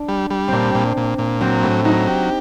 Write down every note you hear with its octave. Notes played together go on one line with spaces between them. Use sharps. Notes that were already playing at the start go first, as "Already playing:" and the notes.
Already playing: D4
G3
G3
A#2 C4 D4
A#2
A#2
A#2
F#3 C4
A2
F#3 D#4
G4